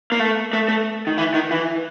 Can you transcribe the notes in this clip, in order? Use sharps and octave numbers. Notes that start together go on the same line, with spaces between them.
A#3
A3
A3
A3
D#3
E3
D#3
E3